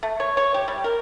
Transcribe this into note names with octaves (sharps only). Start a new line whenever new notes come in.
A3
C#5
C#5
G4
G3
A#4